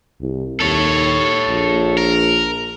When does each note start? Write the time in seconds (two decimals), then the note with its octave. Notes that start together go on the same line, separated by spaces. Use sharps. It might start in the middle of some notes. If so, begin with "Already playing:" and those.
0.21 C2
0.60 D#2 A4 C#5
1.49 A#1
1.97 A#4